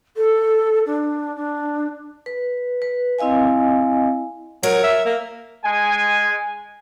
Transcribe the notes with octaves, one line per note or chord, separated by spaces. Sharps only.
A4
D4
D4
B4
B4
C4 E4 D#5 F5 G#5
F#3 A#4 C#5
E5
A#3
G#3 G#5